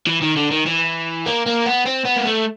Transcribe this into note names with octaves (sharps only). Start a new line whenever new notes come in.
E3
D#3
D3
D#3
E3
A#3
A#3
B3
C4
B3
A#3
A3